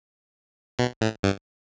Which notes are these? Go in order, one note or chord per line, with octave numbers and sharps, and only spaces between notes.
B2
A2
G2